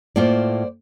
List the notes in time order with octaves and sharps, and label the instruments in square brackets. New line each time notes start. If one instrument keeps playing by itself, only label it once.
[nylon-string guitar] A2 A#3 F4 [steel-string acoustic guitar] C5 D5